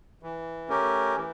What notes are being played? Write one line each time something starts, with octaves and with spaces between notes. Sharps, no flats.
E3
A3 C#4 G4 A#4
E3